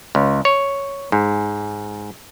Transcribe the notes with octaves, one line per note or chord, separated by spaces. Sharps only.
C#2
C#5
G#2